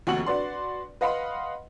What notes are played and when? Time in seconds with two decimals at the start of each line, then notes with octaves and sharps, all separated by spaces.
0.07 F1 D#2 F#4 F#5 C#6 F#7
0.26 D4 F#4 B4 D5 C6
1.01 B4 D#5 F5 F#5 B5 C6